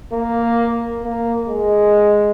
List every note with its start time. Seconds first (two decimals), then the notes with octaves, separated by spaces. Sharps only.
0.12 A#3
1.03 A#3
1.49 G#3